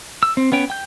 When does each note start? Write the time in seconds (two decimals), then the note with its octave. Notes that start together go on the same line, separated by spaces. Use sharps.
0.23 E6
0.37 C4
0.52 B3 C#4 C#5 G5
0.70 G5 G6